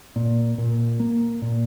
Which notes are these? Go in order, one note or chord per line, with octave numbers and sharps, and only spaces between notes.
A#2
A#2
A#3
A#2